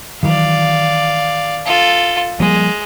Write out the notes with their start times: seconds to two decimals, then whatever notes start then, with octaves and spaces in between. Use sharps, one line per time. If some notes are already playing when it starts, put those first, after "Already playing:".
0.23 D#3 E3 F#3 D5 F5
1.66 F4 A4
2.40 F3 G3 G#3 A#3